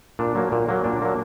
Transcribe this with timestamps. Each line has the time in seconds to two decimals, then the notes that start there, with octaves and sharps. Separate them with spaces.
0.19 A#2 D4
0.35 F#3 A#3
0.52 A#2
0.69 F#3 A#3
0.84 A#2 D4
1.02 F#3 A#3